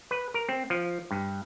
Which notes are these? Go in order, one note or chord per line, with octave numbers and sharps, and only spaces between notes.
B4
A#4
C4
F3
G2